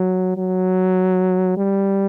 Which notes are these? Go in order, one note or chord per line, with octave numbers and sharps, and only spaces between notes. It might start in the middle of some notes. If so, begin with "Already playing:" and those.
Already playing: F#3
F#3
G3